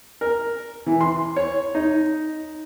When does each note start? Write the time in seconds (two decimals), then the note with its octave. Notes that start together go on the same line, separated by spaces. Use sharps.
0.21 A#4
0.86 E3
1.01 C6
1.36 C#5
1.75 D#4